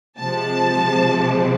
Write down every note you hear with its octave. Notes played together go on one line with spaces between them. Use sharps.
C3 F3 G#3 A5